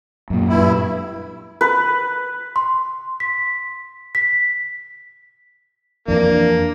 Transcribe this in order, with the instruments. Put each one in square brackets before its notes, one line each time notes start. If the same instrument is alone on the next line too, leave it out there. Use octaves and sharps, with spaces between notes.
[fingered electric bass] F#2 A#2
[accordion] G2 E4
[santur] B4
[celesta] C6
B6
B6
[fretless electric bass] F2 E3 [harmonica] A#3 [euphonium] D4